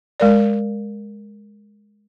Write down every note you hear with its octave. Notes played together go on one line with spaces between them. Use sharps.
G#3 A#4 D5